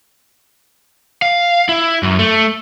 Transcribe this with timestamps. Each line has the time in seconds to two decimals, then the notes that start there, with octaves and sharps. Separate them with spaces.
1.22 F5
1.69 E4
2.03 F#2
2.19 A3